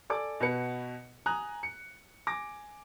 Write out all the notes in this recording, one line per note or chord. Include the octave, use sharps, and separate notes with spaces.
A4 D5 G#5 D6
B2 F#4 B4 C#7
G#5 A#5 D#6 F#6
C#7
G#5 D6 A#6